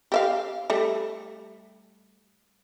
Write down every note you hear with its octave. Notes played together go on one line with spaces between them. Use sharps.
G4 E5 F5
G3 A3